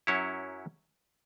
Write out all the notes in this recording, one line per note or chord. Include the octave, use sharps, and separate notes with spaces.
F#2 F#3 C#4 E4 C#5